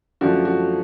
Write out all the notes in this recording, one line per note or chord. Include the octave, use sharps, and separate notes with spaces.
F#2 D3 F3 A3 F#4
F#4